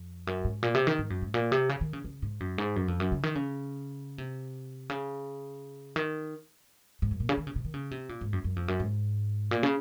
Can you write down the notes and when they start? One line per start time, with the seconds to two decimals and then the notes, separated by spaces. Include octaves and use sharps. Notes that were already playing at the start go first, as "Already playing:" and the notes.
Already playing: F2
0.27 F#2
0.44 G#2
0.63 A#2
0.75 C3
0.87 D#3
0.99 G#2
1.10 F#2
1.22 G#2
1.34 A#2
1.52 C3
1.69 C#3
1.81 D#3
1.93 C#3
2.04 C#3
2.22 G#2
2.40 F#2
2.58 G#2
2.76 F#2
2.88 F2
3.00 F#2
3.12 C#3
3.23 D#3
3.35 C#3
4.18 C3
4.90 C#3
5.96 D#3
7.02 G#2
7.11 F#2
7.20 A#2
7.29 C#3
7.38 D#3
7.47 C#3
7.56 C3
7.65 D#3
7.74 C#3
7.91 C3
8.09 A#2
8.21 G#2
8.33 F#2
8.44 F#2
8.56 F2
8.68 F#2
8.80 G#2
9.51 A#2
9.63 C#3